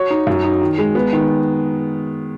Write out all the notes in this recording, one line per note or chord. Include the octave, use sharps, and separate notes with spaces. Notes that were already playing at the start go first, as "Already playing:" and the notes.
Already playing: F#4 C#5
D#4
F#2
D#4
D#3
G#3
B3
D#3